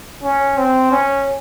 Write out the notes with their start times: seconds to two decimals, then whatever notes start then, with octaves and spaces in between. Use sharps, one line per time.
0.23 C#4
0.58 C4
0.91 C#4